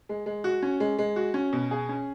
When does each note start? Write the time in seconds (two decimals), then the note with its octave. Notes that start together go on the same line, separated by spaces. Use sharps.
0.09 G#3
0.26 G#3
0.44 F#4
0.62 C#4
0.80 G#3
0.99 G#3
1.16 F#4
1.34 C#4
1.53 B2
1.71 G#4
1.89 C#4